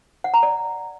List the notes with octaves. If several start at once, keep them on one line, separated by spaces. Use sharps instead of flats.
F#5
A#5
D5